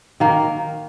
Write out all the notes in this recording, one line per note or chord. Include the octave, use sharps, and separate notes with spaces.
D#3 A#3